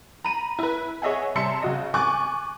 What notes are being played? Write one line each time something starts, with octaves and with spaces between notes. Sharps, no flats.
A#5 B5 D#7
E4 B4
G#4 C#5 D#5 E5 F#5 G#5
C3 G3 E5 A5 C6 C#7
C#3 F#4 D#5
G#5 C#6 D6 F#6 A6